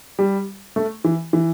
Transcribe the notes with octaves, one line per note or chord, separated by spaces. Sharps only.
G3
A3
E3
E3